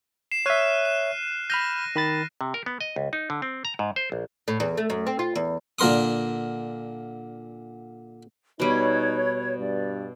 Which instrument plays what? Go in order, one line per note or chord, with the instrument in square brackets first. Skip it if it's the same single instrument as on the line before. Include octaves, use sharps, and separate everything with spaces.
[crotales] C7 E7
[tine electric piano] C#5 E5 [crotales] F6 F#6 D#7
[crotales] E7
[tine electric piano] B5 F6 G6 [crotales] A#6 D#7
[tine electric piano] D#3 B5 A6
[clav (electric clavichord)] C3
A#4
B3
D#5
C#2
D#4
D3
C4
A#5
G#2
C5
A#1
[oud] A2
E2
A3
F#2
C4
F4
E2
[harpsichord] A#2 D3 A#4 C6 D#6
[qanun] B2 G3 [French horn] D#4 [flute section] C#5
[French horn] G2 [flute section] D5